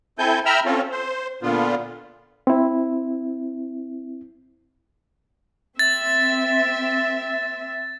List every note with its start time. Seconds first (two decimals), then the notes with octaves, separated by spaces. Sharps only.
0.19 C4 E4 A4 G#5 G6
0.46 E5 G5 A#5 B5 E6 F6
0.65 C4 C#4 F4 A4
0.91 C5
1.42 A#2 D3 B3 F4
2.47 C4 E4
5.79 C4 E5 A6